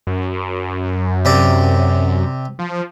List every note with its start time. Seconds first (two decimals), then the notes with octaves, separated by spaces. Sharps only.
0.07 F#2
1.25 C3 D5
2.59 F3